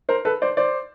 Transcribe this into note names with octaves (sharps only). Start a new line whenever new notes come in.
A#4 C5
A4 B4
C5 D5
C5 D5